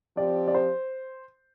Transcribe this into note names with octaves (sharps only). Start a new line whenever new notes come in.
F3 C4 G4 D5
D5
C5